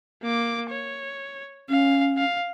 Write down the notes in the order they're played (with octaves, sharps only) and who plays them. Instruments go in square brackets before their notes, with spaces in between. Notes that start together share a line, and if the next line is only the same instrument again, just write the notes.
[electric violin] A#3 D6
C#5
[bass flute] C#4 [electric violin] F5
[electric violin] F5